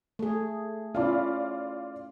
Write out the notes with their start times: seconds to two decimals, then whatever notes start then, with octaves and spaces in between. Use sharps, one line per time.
0.19 A3 G#4
0.95 C#4 E4 F4 D5